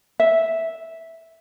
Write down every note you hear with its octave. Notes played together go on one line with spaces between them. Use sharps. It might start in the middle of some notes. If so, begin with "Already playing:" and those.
E5